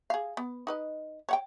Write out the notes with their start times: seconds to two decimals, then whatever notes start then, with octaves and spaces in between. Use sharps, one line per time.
0.10 G#4 F5
0.37 B3
0.67 D#4 B4 D#5
1.29 C#5 F#5 G5